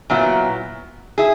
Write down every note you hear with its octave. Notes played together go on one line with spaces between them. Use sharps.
A#2 F#3 B3 E4
E4 G#4